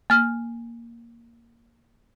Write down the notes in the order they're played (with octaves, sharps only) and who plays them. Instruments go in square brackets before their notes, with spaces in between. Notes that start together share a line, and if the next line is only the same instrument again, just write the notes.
[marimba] A#3 F6